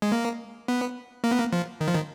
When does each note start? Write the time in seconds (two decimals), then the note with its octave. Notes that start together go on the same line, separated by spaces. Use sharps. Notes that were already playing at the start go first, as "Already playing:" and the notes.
0.02 G#3
0.12 A#3
0.68 B3
1.24 A#3
1.31 B3
1.39 A#3
1.53 F3
1.81 D#3
1.88 F3
1.95 D#3